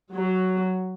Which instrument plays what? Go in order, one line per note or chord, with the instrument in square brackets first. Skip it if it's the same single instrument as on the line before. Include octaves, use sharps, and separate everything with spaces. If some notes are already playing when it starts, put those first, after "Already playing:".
[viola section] F#3